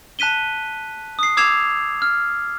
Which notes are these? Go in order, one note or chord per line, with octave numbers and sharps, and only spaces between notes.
A5 F#6 B6 D#7 G7
D#6 C7
D6 E6 G#6 C7 E7 F7
F6